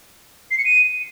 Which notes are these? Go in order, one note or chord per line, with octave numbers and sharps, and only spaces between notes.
C7
C#7
D#7